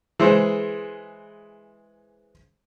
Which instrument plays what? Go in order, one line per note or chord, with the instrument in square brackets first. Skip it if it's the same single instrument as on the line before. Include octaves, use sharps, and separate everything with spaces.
[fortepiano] E3 G#3 G#4 C5